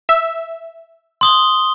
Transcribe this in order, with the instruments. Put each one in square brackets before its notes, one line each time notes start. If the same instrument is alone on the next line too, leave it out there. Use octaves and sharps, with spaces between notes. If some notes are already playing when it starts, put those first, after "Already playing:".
[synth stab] E5
[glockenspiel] C6 D#6 G7